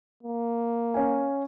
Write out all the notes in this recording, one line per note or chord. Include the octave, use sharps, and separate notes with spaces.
A#3
C#4 F5 G#5